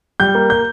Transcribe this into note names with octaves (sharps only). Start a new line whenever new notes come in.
G3 G6
A#3
G6